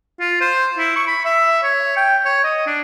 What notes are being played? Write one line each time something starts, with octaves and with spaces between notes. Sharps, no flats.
F4
C5
E4
C#6
B5
E5
C#5
G5
C#5
D#5
D4